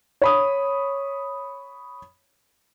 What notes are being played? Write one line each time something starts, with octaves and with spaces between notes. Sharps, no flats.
C#5 B5 D#6